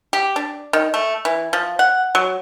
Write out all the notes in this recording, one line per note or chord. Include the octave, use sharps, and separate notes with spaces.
G4
D4
D#3
A3
E3
F3
F#5
F#3